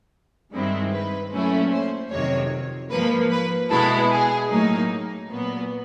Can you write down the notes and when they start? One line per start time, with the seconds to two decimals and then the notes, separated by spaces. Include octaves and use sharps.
0.52 G2 D#3 G#3 C4 E4
0.91 B4
1.31 A#2 F#3 A3 C#4 E4
1.71 C5
2.10 F2 C3 D#3 F#3 C#5
2.91 G#2 F3 A#3 B4
3.30 B4
3.70 B2 G#3 B3 E4 A4
4.10 G#4
4.50 A2 F#3 A#3 D#4
5.30 A#2 F#3 B3